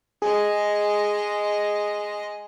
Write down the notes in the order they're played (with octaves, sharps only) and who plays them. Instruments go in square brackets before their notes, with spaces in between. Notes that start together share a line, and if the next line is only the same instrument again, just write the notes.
[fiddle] G#3 D#5 [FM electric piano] G#4